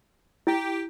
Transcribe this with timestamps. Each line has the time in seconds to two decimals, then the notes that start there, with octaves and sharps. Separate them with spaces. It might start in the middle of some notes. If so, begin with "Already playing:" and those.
0.47 E4 G4